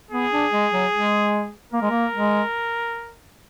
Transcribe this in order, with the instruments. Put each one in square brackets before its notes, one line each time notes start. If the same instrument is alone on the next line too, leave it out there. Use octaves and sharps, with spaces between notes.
[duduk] B3 [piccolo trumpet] G#4
[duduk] D4
G#3
F#3
G#3
[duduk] A#3 [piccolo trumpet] A#4
[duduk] G#3
A#3
G#3